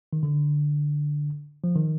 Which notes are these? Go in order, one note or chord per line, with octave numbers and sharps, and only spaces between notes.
D#3
D3
F3
D#3